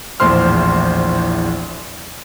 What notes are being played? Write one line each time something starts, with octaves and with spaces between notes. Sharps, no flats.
A#1 E2 A2 C5 C6 F6